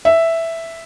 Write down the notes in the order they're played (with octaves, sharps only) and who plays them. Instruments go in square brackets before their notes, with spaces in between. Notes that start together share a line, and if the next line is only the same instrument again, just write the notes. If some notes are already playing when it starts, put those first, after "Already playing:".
[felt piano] E5